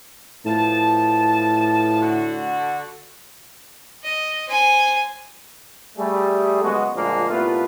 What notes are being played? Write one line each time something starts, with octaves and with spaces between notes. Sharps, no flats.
A2 F3 B3 A5
D3 F#4
D#5
C5 G#5
G3 A3 G#4
F#2 C#3 G#3 B3 F#4
D2 A#2 F3 G#3 A#3 D4
C2 A#2 A3 B3 F4 B4